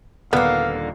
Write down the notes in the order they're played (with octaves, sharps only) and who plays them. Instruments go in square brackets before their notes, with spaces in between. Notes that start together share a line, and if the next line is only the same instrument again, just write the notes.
[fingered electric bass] D#1 [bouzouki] D3 A#3 [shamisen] B3 [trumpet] F5